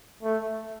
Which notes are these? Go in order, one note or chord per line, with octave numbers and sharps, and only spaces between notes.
A3